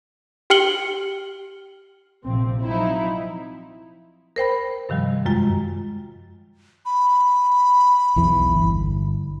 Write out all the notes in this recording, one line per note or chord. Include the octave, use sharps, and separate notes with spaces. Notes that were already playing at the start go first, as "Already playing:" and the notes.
G4 G5 F6 C#7 F#7 G7
A#1 C3 F3 C4
F3 F#3 C4 D#4 E4
A#4 C5 G5 B5
G2 C3 D#3 F3 G3
F#2 G#3 F4 G5
B5
B1 E2 E3
G1